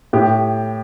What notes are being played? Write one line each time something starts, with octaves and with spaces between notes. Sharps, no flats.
A2 G4